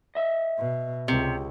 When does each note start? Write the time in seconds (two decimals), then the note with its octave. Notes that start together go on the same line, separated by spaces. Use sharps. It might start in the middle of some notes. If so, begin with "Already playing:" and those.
0.15 D#5 E5
0.58 B2
1.08 C#2 C3